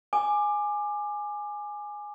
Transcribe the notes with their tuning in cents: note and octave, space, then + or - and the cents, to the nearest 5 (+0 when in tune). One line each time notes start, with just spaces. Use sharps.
G#5 +0 D6 +20